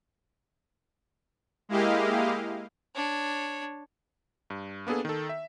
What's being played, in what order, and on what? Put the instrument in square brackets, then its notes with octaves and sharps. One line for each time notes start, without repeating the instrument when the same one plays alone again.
[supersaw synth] G#3 A#3 E4 G4 D#5 F5
[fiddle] D4 C#5
[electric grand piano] G2
A#3 B3 D4 G#4 A4
D#3 A4
E5